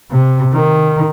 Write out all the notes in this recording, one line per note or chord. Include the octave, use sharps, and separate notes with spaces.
C3
D#3